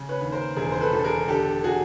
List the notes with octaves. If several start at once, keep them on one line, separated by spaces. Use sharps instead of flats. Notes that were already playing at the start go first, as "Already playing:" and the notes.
Already playing: C#3
B4 C#5
D#2
A#4 C5
E1 G#4 A#4
C5
A4 B4
E1 A4
G#4 A#4
D3 G4 A4
F#4 G#4